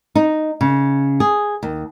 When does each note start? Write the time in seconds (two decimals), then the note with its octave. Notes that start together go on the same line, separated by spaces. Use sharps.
0.15 D#4
0.61 C#3
1.20 G#4
1.63 D#2